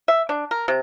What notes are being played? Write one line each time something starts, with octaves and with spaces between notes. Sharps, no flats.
E5
D4
A#4
C3